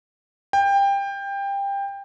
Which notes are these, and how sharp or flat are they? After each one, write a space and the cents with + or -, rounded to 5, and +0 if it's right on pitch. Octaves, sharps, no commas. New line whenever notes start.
G5 +20